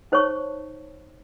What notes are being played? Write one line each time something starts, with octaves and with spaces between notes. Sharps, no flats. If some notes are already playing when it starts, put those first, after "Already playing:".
D#4 C5 C#5 A5 C#6